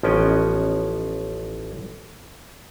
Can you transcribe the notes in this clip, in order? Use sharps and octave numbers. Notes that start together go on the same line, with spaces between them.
A1 F3 B3 C#4 D#5 G5